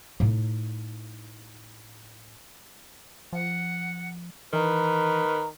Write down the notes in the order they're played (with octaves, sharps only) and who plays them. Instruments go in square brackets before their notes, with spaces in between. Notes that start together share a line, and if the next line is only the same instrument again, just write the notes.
[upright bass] A2 D#4
[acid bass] F3 [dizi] F#5
[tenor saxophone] D#3 [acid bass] E3 [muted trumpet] B4 [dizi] A#5